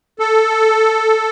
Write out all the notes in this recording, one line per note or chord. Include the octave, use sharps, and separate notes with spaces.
A4